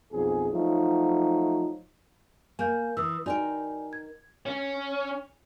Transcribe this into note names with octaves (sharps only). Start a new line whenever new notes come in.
B1 F2 G#4
F3 F#3 A3 D#4
A#3 G#5 G6
E3 D#6 E6
D#4 F#4 A#4 D5 G5 G#5
G#6
C#4